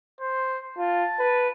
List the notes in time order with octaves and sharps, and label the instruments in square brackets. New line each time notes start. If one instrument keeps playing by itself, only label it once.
[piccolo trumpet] C5
[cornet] F4 [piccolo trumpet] A5
[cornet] B4